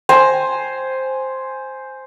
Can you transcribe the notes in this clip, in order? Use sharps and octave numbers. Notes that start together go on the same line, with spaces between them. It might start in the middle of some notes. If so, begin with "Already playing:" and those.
C5 G#5 A#5